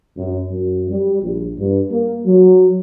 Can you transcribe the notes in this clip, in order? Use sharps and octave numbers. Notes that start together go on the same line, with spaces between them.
F#2
F#2
G3
A#1
G2
A#3
F#3